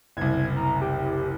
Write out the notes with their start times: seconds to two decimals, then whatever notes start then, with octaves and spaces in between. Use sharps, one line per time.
0.17 F#1 C2 G#6
0.56 A#5
0.81 G4